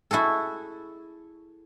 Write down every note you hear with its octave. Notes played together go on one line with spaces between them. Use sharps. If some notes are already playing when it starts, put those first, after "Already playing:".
E4 F#4 G#4 A4